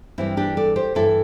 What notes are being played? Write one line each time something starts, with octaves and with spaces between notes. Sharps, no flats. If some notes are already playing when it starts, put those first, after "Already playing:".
G2 E3 G3 C4 E4
D4 G4
A4 D5
G4 C5
G2 E3 G3 E4 A4